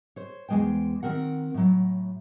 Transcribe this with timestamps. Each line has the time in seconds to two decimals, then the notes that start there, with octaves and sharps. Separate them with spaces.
0.16 C5 C#5
0.49 E2 F3 G#3 C5 G5
1.03 D#3 C4 A#4 F#5
1.54 A2 F#3